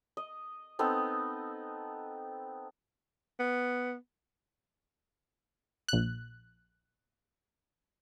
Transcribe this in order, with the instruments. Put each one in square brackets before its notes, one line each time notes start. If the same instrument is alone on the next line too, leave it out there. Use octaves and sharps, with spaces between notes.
[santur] D#5
B3 C4 D#4 A4
[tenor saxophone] B3
[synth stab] A#1 F#6